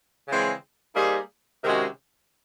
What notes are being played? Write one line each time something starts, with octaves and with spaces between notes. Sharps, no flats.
C#3 E3 G#3 C4
G3 A#3 D#4 G#4 C5
C3 D#3 G#3 C#4 F#4